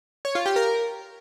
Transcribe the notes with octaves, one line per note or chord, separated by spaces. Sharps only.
C#5
F4
G4
A#4